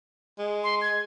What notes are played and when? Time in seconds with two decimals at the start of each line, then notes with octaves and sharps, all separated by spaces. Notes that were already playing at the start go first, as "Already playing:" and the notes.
0.39 G#3
0.64 C6
0.82 G#6